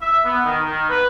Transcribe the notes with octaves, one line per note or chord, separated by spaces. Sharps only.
E5
B3
D#3
D#3
B4